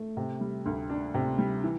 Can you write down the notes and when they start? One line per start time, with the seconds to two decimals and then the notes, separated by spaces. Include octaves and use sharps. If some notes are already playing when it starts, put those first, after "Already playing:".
Already playing: A3
0.17 C3
0.41 G3
0.66 D2
0.90 D4
1.14 C3
1.38 G3
1.64 E3